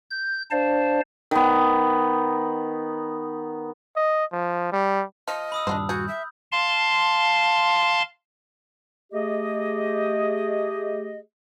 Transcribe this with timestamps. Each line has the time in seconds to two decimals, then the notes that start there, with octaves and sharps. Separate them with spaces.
0.11 G6
0.51 D4 C5 D5 F5 A5
1.31 D#3 B3
3.96 D#5
4.32 F3
4.72 G3
5.28 F3 D#5 F6
5.52 B5 D#6 E6
5.67 D#1 G#1 G2 D4 F4 C5
5.89 F#4 G#4 G6
6.08 E5
6.52 F5 A5 C6
9.13 A3 G4 G#4 D#5